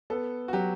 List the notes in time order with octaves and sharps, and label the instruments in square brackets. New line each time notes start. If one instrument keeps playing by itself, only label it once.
[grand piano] B3 [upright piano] A4
[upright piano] F#4
[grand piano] F#3 [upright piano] G4